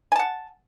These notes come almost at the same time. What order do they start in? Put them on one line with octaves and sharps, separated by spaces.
G#5 A5 F#5